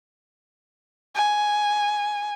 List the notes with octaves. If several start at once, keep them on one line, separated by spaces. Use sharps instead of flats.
G#5